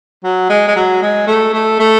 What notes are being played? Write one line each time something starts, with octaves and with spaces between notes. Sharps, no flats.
F#3
G#3
G#3
F#3
G#3
A3
A3
A3